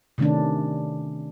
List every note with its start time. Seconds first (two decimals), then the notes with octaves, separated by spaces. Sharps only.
0.18 C3 D#3 A3 C#4 D4